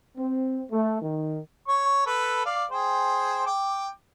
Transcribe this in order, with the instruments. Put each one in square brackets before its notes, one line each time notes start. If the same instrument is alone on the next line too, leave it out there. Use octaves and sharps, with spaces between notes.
[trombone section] C4
A3
D#3
[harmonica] C#5 C#6
A4 B4
D5 F5
G#4 C5 G5
G5 D6